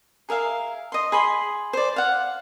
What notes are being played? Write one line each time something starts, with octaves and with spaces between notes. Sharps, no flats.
G#4 A#4 E5 F5
D#5 C6
G#4 B5 C6
C5 D5
F5 F#5